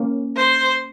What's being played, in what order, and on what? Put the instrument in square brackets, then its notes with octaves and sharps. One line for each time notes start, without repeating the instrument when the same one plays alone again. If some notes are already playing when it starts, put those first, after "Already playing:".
Already playing: [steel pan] A#3 C#4
[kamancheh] C5